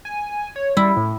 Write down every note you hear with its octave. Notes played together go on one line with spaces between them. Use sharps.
G#5
C#5
G3 E4
A2